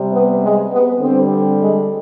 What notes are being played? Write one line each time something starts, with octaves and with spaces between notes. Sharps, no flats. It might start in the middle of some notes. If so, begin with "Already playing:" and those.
Already playing: C3 G3
B3
G#3
B3
D3 G3 C4
G#3